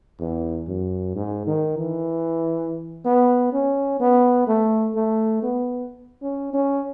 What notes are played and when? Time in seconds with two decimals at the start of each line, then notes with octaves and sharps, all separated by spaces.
0.20 E2
0.68 F#2
1.15 G#2
1.47 D#3
1.78 E3
3.05 B3
3.53 C#4
4.00 B3
4.47 A3
4.95 A3
5.43 B3
6.22 C#4
6.53 C#4